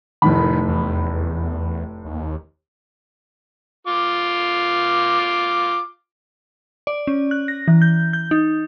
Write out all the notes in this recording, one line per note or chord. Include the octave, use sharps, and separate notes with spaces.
F1 A2 D#3 B5
E2
D#2
F4 D6
D5
C#4
F#6
A#6
E3
G6
G6
D#4